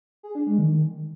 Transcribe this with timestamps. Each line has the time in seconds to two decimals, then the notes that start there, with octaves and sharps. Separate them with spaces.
0.23 G#4
0.35 D4
0.47 G#3
0.58 D#3